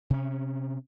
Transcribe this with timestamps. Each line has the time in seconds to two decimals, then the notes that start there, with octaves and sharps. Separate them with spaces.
0.10 C3 C#4